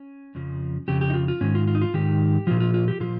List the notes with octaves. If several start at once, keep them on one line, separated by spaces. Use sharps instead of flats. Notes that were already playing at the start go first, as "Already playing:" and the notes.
Already playing: C#4
F2 C#3 F3
F2 C#3 G4
G4
D#4
F4
F4
G#2 D#3 C#4
F4
F4
D#4
F4
G#2 D#3 G4
A#2 F3 F4
F4
F4
G4
A#2 F3 F4